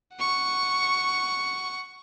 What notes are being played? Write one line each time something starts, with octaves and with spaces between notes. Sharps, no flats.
F#5 C#6